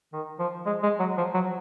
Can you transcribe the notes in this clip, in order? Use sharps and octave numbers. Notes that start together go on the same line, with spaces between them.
D#3
F3
G#3
G#3
F#3
F3
F#3